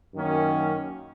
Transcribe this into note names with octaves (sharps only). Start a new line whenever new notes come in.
F#2 D#3 A#3 C#4